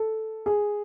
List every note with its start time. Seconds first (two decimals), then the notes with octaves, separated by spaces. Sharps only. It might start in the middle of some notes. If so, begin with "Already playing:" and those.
Already playing: A4
0.46 G#4